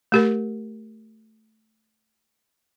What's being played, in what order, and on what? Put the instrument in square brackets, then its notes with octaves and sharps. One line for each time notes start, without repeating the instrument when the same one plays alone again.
[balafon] A3 G4 A#4